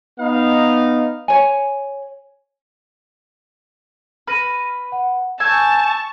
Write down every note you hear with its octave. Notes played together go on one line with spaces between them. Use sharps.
B3 D#4 F5
C#5 G#5
B4 F6 A#6 D#7
F#5
G#5 A5 C#6 E6 G6